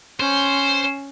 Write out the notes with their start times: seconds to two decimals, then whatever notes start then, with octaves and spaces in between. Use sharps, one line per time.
0.20 C#4 C5